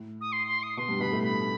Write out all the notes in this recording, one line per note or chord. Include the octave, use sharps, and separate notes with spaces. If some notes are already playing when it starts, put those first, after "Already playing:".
Already playing: A2
D#6
C6
C6
D#6
B2 C6
G2 G3
B2 B3 B5
A2 A3
B5